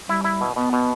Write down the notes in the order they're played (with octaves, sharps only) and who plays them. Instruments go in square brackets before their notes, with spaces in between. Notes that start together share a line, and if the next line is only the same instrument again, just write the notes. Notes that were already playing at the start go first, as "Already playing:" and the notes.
[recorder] G3 [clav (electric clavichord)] E4
[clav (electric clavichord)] E4
B2
[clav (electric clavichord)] B2 [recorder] B3
[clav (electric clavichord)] B2